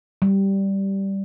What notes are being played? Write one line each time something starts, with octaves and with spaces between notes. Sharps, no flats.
G3